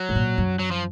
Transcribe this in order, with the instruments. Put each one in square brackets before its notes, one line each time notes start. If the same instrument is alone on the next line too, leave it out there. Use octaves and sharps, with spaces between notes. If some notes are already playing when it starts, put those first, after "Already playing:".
Already playing: [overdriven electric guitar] F#3
[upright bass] G#2
A#2
F#2
[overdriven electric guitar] F#3
F3